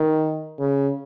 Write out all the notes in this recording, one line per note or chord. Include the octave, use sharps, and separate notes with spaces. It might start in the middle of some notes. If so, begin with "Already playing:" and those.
Already playing: D#3
C#3